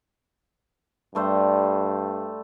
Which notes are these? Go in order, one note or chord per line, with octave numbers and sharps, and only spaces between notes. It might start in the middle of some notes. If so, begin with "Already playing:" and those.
G2 G3 A3 C5